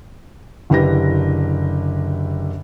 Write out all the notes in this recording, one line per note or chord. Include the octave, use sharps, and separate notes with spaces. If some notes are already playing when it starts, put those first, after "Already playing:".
F#1 D3 E4 G4 B4 A#6